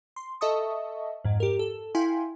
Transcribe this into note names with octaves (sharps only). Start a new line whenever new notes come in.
C6
A4 D#5 E5 A5 C#6 D#6
F2 G#2
G4 A#4
A4
E4 F5 G5 G#5 C6